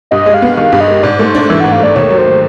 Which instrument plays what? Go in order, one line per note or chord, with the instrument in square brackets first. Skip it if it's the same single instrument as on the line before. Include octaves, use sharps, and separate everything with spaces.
[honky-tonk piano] G2 [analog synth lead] D#5
[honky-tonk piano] G#3
[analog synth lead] F5
[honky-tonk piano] B3
[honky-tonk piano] D#3 [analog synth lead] F5
[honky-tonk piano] G2
[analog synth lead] D#5
[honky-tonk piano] G#3
[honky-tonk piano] G#2 [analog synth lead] D5
[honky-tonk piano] A3
[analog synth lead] C5
[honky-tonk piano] D4
[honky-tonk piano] E3 [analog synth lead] E5
[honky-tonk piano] G#2 [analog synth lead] F#5
[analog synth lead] F5
[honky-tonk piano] A3 [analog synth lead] D5
[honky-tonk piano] D#2 [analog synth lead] C#5
[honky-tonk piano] F#3
[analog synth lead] C5